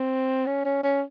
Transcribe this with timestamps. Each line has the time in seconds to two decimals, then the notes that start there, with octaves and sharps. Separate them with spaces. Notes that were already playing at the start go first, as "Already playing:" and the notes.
Already playing: C4
0.47 C#4
0.65 C#4
0.83 C#4